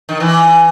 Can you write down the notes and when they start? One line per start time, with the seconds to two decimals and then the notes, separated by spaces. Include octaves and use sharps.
0.09 D#3
0.20 E3